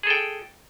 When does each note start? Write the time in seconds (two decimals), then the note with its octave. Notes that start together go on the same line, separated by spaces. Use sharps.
0.03 G#4
0.07 A4
0.10 G5